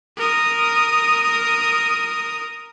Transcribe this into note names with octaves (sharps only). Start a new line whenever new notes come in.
A#4 D#6